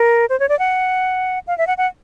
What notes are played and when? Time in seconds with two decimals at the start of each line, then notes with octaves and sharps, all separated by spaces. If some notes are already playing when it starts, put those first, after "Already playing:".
Already playing: A#4
0.29 C5
0.40 C#5
0.49 D5
0.59 F#5
1.47 F5
1.58 E5
1.67 F#5
1.78 F#5